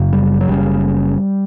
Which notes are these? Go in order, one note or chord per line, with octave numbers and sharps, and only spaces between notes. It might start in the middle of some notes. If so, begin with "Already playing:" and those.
Already playing: F#1 F#2 C#3
G3
F#3
F#1 F#2 C#3 G3